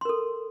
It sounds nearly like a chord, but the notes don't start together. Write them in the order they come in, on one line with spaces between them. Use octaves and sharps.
C6 A#4 A4